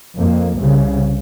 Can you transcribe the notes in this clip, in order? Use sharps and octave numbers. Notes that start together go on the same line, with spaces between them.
F2 A#3
C2 C#3